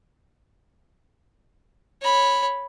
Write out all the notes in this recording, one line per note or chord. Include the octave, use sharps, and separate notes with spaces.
C#5 B5